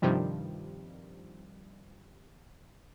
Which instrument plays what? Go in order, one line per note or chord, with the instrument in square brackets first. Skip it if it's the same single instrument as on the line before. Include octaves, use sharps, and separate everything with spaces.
[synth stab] G2 C3 D#3 F3 G3